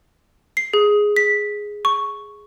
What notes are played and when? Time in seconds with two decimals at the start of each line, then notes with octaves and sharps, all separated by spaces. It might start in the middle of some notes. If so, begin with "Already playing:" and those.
0.57 C7
0.74 G#4
1.16 B6
1.85 C#6